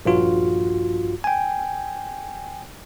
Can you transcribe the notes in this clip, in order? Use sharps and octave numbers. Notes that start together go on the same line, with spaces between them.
A#1 G2 F4 F#4
G5 G#5